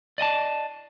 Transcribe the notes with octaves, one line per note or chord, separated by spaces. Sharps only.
D5 D#5 G5 A5